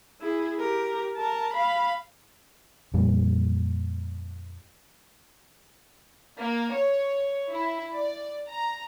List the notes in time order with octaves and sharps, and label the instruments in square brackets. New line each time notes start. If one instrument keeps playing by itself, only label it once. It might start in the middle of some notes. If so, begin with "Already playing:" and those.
[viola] E4 G#4
G4 A#4
A#4 A5
F5 B5
[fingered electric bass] F2 A#2 G3
[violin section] A#3
C#5
E4
D5
A#5